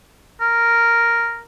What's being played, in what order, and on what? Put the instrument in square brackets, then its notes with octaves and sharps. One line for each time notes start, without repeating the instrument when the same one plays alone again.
[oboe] A#4